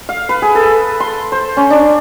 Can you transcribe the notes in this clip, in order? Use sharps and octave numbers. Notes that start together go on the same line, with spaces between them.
F5
B4
G#4
A4
C6
C5
C#4
D4